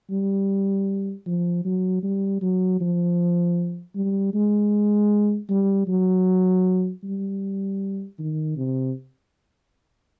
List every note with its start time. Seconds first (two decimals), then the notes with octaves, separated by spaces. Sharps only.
0.11 G3
1.26 F3
1.65 F#3
2.03 G3
2.42 F#3
2.81 F3
3.95 G3
4.34 G#3
5.50 G3
5.88 F#3
7.03 G3
8.19 D#3
8.57 C3